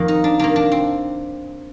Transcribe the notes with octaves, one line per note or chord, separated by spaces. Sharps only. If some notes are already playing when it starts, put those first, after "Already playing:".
Already playing: F2 D#3 A#3
D#4
D4
C3 D#3 A#3 D4
D4
C4